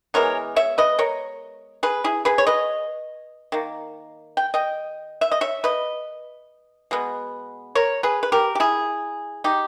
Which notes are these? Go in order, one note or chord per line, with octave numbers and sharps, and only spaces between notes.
E3 G#3 B3 A#4 C#5
C#5 E5
B4 D#5
A#4 C#5
G#4 B4
E4 G#4
G#4 B4
C#5
B4 D#5
D#3 A#3
G5
D#5 G5
E5
D#5
C#5 E5
B4 D#5
B2 G#3 B3
A#4 C#5
G#4 B4
B4
G4 A#4
G4
E4 G#4
D#4 G4